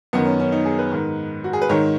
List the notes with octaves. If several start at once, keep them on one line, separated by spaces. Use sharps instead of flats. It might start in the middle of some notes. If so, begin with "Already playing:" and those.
F#2 D#3 B3
C#4
C#4
D#4
G#4
B4
G#2 D#3
F#4
G#4
B4
G#2 D#3 C#5